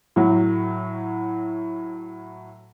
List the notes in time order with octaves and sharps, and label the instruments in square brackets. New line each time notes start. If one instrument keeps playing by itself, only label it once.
[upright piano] A2 F#3